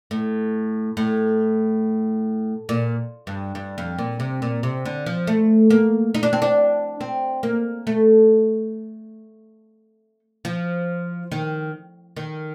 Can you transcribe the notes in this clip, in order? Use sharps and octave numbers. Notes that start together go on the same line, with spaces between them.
A2
A2
A#2
G2
G2
F2
A#2
C3
A#2
C3
D3
F3
A3
A#3
D#4
D4
C4
D4
C4
A#3
A3
F3
D#3
D#3